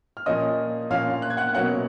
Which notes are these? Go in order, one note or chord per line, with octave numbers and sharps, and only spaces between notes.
F6
A#2 F3 A#3 C#4 D#5 D#6
A#2 F3 A#3 C#4 F5 F6
F#6
G#6
F#5 F#6
B2 F#3 A#3 C#4 F#5 F#6